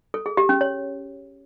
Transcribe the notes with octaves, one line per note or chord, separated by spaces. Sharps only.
A4
G#4
G4
C#4
C#5